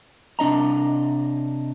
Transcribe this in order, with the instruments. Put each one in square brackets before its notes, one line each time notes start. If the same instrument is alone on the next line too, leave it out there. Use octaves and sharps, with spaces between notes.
[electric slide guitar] C3 D4 D#5 A#5